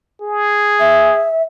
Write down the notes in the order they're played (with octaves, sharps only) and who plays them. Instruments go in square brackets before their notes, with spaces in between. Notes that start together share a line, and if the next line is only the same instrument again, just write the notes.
[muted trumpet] G#4
[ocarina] E5